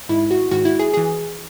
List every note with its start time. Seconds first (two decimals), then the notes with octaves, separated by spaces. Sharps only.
0.09 G#2 D#3 G#3 E4
0.31 F#4
0.51 G#2 D#3 G#3 F#4
0.65 E4
0.79 G#4
0.94 E3 G#4